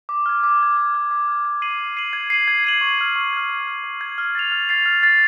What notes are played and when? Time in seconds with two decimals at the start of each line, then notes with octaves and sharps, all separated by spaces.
0.09 D6
0.26 F6 G#6
0.43 D6
0.60 F6 G#6
0.77 D6
0.94 F6 G#6
1.11 D6
1.28 F6 G#6
1.45 G#6
1.62 C7 D#7 F#7
1.79 G#6
1.97 C7 D#7 F#7
2.13 G#6
2.30 C7 D#7 F#7
2.48 G#6
2.64 C7 D#7 F#7
2.81 C#6
2.99 F6 G#6
3.16 C#6
3.33 F6 G#6
3.50 C#6
3.67 F6 G#6
3.84 C#6
4.01 F6 G#6
4.18 F6
4.35 A6 C7 F7
4.52 F6
4.69 A6 C7 F7
4.86 F6
5.03 A6 C7 F7